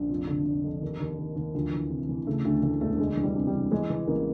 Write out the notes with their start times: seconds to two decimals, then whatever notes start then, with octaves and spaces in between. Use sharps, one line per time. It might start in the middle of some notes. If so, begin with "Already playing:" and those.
Already playing: A#1
0.09 F1 F3
0.27 D3
0.46 F1
0.64 F2
0.81 D#2
1.00 D#2
1.18 D#3
1.36 D#2
1.55 D2 F3
1.72 E3
1.90 C3
2.09 E3
2.27 C#3 A3
2.45 D2 A3
2.63 E3 A3
2.81 E1 A3
2.98 D2 G#3
3.17 E3
3.23 G3
3.35 C3
3.47 G3
3.53 E3
3.71 E3 G#3
3.90 E3
4.07 A1 A#3